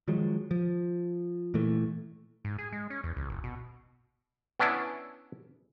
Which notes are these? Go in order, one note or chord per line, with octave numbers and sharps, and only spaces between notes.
D#3 F3 F#3 G#3
F3
A#2 E3 A3
G#2
G#4
G#3
C#4
E2
C#2
F#1
B2
B3 C#4 D4 E4